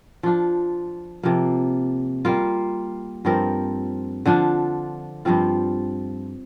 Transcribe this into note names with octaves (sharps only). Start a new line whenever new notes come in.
F3 D4 F4
C3 F3 A#3
G3 A#3 F4
G2 F3 C4 A#4
D3 F3 D4 F4
G2 F3 C4 F4